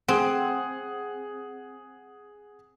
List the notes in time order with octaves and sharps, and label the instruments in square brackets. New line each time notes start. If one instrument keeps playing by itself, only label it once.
[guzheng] C4 [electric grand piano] G#4 F#5